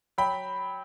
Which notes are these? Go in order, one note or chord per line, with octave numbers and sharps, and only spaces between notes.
F#3 G5 B5